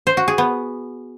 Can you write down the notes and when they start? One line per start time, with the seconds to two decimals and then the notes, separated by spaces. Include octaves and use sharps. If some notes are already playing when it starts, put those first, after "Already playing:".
0.07 C5
0.17 F#4
0.28 G#4
0.38 B3